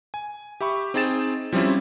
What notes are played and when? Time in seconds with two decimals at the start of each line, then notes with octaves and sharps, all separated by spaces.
0.14 G#5
0.61 G4 E5 B5 C#6
0.94 C4 D#4 G#4 G5 A6 E7
1.52 F3 G3 C4 C#4 E4